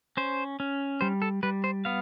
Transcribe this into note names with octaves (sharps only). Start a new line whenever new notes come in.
C#4 C5
C#4
G3 C5
A4
G3 B4
C5
B3 F5